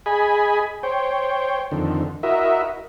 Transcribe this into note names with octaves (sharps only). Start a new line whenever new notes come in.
G#4 D#5 G#5 B5
C5 C#5 G5
F2 D3 D#3
E4 F#4 A#4 D#5 E5